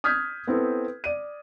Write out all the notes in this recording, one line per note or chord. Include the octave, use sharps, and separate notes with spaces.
D#6 F6 G6 G#6 B6
B3 C4 E4 A4
D5 D#7